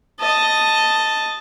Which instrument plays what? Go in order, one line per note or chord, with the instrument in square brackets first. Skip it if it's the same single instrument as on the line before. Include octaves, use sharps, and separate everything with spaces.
[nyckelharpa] D#5 A5